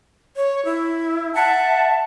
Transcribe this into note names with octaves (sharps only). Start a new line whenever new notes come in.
C#5
E4
E5 F#5 A5